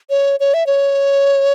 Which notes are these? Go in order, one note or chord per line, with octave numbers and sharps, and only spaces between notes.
C#5
C#5
E5
C#5